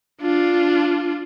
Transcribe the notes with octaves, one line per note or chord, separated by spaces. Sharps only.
D4 F4